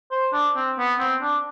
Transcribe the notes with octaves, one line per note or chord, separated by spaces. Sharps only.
C5
D4
C4
B3
C4
D4